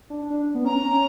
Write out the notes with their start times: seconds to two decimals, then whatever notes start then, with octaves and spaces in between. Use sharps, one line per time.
0.10 D4
0.30 D4
0.55 B3
0.65 C#4 A#5
0.83 C#4